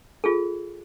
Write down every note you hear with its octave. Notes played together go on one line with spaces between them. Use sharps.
F4 G#4 A4